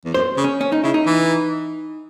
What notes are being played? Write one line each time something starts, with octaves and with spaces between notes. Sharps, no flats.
E2
F#2 C5
C#3
C#4
C#4
D#4
C#3 E4
D#4
E3